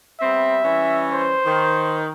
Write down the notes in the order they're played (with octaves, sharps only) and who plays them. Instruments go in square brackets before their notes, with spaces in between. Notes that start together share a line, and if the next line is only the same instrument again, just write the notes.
[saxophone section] G3 B3 C4 [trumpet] E5
[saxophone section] E3 G3 C#4
[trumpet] C5
[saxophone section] D#3